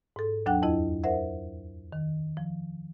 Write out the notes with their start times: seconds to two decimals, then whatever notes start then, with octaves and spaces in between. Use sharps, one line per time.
0.16 G#2 A4
0.46 D#2 F#3 D4 F#5 G5 F#6
0.62 F2 E4 D#5
1.04 A#4 C5 E5 F#5
1.93 D#3
2.37 F3